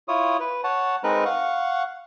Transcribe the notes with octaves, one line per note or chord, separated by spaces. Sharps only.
E4 F4 C#5 D#6
B4
C#5 F#5 A5
G#3 C4 D#4 A#4 B4 F#6
F5 F#5 C#6